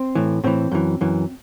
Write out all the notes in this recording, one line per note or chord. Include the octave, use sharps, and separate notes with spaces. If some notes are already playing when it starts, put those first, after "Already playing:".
Already playing: C4
A2 E3
A2 E3 C4
F#2 E3
F#2 E3